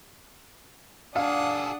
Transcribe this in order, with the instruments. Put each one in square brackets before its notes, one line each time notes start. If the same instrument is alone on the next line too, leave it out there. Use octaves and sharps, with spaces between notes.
[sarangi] D4 [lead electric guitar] G#4 A4 [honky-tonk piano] F5 [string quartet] F#5 D#6